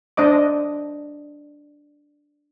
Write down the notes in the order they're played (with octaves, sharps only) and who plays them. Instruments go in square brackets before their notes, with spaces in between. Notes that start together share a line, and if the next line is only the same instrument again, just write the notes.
[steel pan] D4 C5 D#5 D6